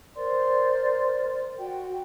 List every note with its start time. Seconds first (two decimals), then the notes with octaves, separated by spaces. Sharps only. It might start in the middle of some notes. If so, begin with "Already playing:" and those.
0.15 A#4 C5 D5 C6
1.58 F#4 G5